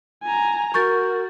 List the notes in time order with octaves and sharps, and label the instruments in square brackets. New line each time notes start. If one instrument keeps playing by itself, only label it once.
[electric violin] G#5 A#5
[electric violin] F#4 [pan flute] A#4 [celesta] C#6 G6 A6